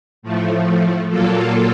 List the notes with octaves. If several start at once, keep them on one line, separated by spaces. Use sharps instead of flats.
A2 F3 A3
A#2 F#3 A#3 F4 A4